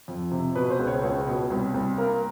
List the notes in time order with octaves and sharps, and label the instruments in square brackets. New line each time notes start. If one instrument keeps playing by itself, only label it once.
[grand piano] F2
C3
B2 B4
C5
C#2
C#5
C#2
B2
C2
C2
A#3 A#4